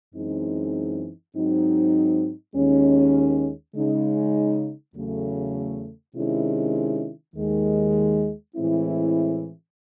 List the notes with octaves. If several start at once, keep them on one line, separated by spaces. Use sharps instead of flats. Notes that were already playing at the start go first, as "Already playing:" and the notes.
F#2 E3 G#3 C4 D#4
G#2 F#3 C4 D#4
D#2 D#3 G#3 C#4
C#3 G#3 D#4
E2 C#3 F#3 A3
C3 D#3 G#3 C#4 E4
D#2 D#3 G#3
A2 E3 G#3 C4 E4